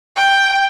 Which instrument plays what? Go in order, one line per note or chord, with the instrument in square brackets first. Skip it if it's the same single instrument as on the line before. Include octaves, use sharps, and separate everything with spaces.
[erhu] G5